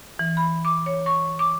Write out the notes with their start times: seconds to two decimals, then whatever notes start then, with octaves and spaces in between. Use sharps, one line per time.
0.19 E3
0.37 B5
0.65 D6
0.86 C#5
1.06 C#6
1.39 D6